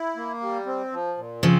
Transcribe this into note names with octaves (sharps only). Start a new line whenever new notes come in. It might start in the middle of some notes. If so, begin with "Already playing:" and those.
Already playing: E4
A#3
G3
C4
F3
A#2
C#3 F3 C4